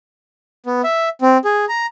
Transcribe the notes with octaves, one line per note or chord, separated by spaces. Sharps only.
B3
E5
C4
G#4
A#5